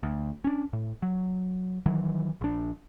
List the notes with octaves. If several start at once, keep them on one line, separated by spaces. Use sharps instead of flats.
D2
C#4 D4
A2
F#3
D#3 E3 F#3
A#1 D4